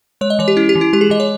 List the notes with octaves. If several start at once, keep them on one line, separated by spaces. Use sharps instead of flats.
G#3 C#5
D#5
E3 C#5
G4
C#4 E4
G4
E3
E4
G#3 G4
G#4
E3 D#5
C#5